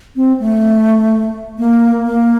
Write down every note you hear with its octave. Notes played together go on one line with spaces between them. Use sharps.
C4
A3
A#3
A#3